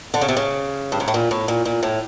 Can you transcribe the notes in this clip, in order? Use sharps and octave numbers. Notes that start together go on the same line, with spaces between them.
D3
C#3
C3
C#3
G2
G#2
A2
A#2
A2
A#2
A#2
A2